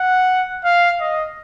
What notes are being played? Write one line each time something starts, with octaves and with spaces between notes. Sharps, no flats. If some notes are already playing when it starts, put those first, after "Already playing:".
Already playing: F#5
F5
D#5